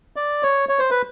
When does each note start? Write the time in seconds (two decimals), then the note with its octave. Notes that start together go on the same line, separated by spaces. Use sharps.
0.16 D5
0.43 C#5
0.69 C#5
0.79 C5
0.91 B4